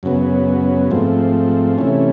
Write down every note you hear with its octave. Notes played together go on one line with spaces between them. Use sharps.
F#2 C#3 F#3 B3
G#2 F3 A3 C4
C3 E3 A3 C#4